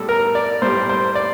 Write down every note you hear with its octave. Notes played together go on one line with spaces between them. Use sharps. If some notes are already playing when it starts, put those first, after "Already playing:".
Already playing: A2 G3 A4
A#4
D5
A2 G3 C5
C5
D5